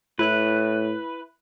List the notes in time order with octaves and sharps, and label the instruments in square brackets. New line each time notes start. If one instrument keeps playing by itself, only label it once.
[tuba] A2 [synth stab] E4 F#6 [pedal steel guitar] B4